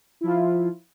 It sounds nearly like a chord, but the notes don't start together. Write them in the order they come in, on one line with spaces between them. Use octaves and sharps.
E4 F3 F4